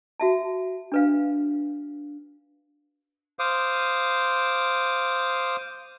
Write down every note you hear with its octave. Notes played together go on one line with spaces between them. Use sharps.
F#4 E5 A5
D4 B4 F5
C5 F5 D6 D#6